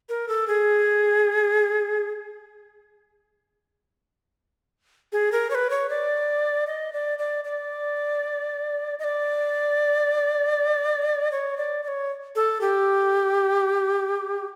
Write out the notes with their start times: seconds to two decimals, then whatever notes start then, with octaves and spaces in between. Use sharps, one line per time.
0.09 A#4
0.28 A4
0.48 G#4
5.12 G#4
5.32 A#4
5.50 C#5
5.55 B4
5.70 C#5
5.89 D5
6.67 D#5
6.93 D5
7.19 D5
7.44 D5
8.99 D#5
9.04 D5
11.32 C#5
11.57 D5
11.84 D5
11.88 C#5
12.35 A4
12.61 G4